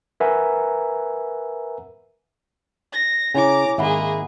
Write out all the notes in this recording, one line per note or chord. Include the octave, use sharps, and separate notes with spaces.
A#4 B4 E5 F#5 G#5 A#5
A#6
C#3 E4 C#5 G#5 A#5 D6
G#1 G#3 A#3 G#4 E5 F#5 B5